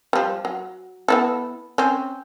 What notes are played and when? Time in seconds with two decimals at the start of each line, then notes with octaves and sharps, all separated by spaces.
0.13 F3 G3
0.45 F#3
1.08 B3 E4 A4
1.78 C4 C#4